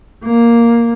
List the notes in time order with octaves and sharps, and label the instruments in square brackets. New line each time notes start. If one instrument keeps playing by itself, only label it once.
[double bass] A#3